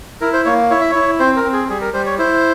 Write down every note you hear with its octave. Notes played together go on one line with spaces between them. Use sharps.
E4 A#4
C5
A#3 C#5
E4 C#5
E5
E4 C#5
C4 C5
A#4
C4
G#4
G3 G#4
A#4
G3 C5
C#5
E4 C5